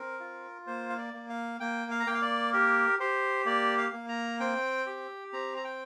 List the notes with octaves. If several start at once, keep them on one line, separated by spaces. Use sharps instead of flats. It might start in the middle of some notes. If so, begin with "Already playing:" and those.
Already playing: C4 A#4
F4
A#3 C5
F5
D5
A#3
F5
A#3 G5
F5
A#5
A#3 G5
F5
D5
G4 A#4
G4 C5
A#3 D5
F5
A#3
A#5
C4 G5
G4
C4 A#5
A#5
G5